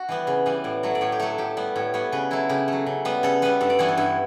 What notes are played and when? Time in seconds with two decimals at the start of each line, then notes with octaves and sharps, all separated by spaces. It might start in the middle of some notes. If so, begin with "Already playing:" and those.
Already playing: F#4
0.09 E3 G3 B3
0.27 C#3
0.46 E3 G3 B3
0.64 A2 D5
0.83 F#3 A3
0.95 D5
1.01 A2 C#5
1.12 G4
1.20 F#3 A3 A4
1.38 A2 G4
1.57 G3 B3
1.76 A2 C#5
1.94 G3 B3 C#5
2.12 C#3 B4
2.31 F#3 A3 E4
2.49 C#3 G4
2.68 F#3 A3
2.86 C#3
3.05 G3 B3
3.23 C#3 A4
3.42 G3 B3 B4
3.61 G2 A4
3.70 D5
3.79 E3 G3 B3 C#5
3.88 A4
3.97 G2 E4